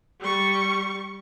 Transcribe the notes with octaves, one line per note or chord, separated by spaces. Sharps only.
G3 C#6